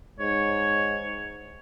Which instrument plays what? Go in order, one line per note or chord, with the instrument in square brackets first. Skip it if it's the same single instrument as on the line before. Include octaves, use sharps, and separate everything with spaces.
[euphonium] G#2 [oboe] C#5